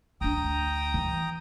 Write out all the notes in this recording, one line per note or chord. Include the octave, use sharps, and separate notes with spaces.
D2 D4 G5 A#5 D#6
E3